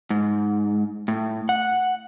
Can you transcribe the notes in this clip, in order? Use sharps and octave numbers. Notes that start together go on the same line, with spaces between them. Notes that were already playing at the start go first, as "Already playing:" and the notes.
G#2
A2
F#5